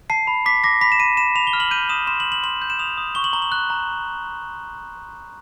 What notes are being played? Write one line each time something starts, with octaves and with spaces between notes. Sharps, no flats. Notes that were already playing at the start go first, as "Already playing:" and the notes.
A5 C7
B5
D6 B6
D6 A#6
B5 B6
E7
B5 D#7
B5 E7
B5 F7
G7
F6
F#7
G6 D#7
D#6 E7
C6 E7
F#7
C6
F#7
C6 F#7
G6
E7
D#6 F7
D#6
C#6 G7
F#7
A#5 G7
F#7
F#6
A#5